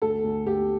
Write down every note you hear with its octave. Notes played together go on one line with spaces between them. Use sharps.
D2 A4
D2
D2 G4